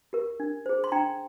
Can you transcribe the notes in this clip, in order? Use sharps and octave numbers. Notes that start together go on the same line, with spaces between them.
G4 A#4
D4
G#4 C5
C6
D4 G5 A#5